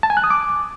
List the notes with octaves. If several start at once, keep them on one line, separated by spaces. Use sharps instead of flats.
A5
G#5
F#6
D#6
D6